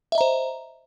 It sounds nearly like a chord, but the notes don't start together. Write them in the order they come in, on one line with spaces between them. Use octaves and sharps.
E5 D#5 A#5 C5